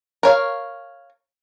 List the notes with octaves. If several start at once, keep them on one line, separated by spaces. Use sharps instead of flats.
A#4 C#5 F5